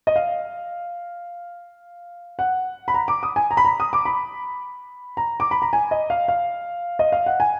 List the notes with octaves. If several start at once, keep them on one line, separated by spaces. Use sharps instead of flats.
D#5
F5
F#5
B5
A#5
D6
D#6
G#5
A#5
B5
A#5
D#6
D6
B5
A#5
D6
B5
A#5
G#5
D#5
F5
F5
D#5
F5
F#5
G#5